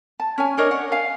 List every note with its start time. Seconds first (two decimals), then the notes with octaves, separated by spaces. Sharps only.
0.20 A5
0.38 C#4 C#5 G#5
0.57 D4 A#4 C#5 D#5
0.71 F#5
0.92 F5 G#5